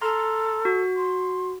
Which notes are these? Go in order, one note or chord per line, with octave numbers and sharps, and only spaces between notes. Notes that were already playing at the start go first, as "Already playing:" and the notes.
A4 A#5 C6 F6
F#4
C6